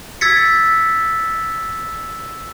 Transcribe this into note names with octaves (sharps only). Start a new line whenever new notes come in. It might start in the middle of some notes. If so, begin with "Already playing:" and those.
E6 G#6 A6 B6 C#7